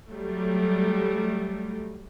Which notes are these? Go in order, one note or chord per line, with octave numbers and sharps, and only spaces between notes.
F#3 G3 A3